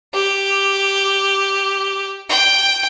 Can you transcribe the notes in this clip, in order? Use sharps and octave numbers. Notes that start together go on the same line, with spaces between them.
G4
G5